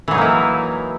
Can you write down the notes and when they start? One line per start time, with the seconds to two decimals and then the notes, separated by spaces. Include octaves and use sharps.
0.08 E3
0.11 F#3
0.14 D#4
0.18 A#3
0.21 E4